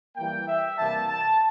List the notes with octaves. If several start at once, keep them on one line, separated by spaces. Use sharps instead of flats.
E3 G3 A#3 G5
E5
C3 E3 G3 A#3 A5
A5